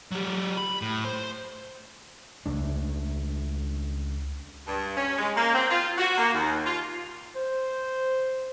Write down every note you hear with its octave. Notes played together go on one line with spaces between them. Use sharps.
F#3 G4
B5
A2
C5
C#2 A3 D4
G2
C#4
G#3
A#3
C4
F4
F#4
A#3
D#2
F4
C5